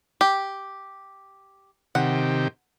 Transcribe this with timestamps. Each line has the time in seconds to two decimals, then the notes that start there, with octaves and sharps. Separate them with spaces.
0.21 G4
1.95 C3 D#3 G4 F#5